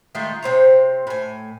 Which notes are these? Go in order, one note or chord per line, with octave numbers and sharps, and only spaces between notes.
D#3 G#3 A3 F4
C3 E3 C4 C#5
A2 G#5